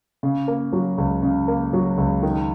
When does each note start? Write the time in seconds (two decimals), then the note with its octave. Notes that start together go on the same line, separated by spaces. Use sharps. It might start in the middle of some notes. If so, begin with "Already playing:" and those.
0.23 C#3
0.47 A#3
0.73 F#3
0.98 C#2
1.22 C#3
1.48 A#3
1.73 F#3
1.98 C#2
2.23 D#3